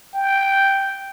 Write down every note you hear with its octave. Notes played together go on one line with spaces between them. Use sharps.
G5